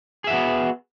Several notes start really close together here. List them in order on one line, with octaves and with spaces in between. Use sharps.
G#4 E5 F#4 B3